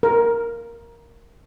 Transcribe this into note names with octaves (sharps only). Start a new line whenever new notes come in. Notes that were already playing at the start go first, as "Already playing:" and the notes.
A#4